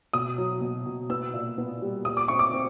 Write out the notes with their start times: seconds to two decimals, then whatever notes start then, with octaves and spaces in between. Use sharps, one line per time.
0.13 B2 D#6
0.38 F#3
0.61 B2
0.86 B2
1.10 B3 E6
1.34 A#2
1.58 B3
1.82 G3
2.05 A#2 D#6
2.17 D6
2.28 C4 C#6
2.39 D6
2.53 C4